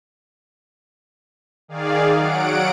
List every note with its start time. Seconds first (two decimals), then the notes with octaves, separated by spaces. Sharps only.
1.68 D#3 G#4 D5 F5
2.17 F#3 F#5 D7